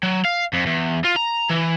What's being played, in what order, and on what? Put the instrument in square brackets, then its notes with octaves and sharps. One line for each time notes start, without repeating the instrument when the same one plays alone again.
[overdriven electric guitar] F#3
F5
F2
E2
F4
A#5
E3